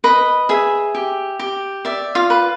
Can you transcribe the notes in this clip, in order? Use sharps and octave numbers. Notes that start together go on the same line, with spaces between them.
B4 D#5
G#4 E5
G4
G4
D5 E5
F4 F5
B4